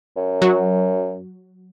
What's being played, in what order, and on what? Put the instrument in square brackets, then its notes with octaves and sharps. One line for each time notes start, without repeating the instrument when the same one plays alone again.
[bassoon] F#2
[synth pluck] F#3 F#4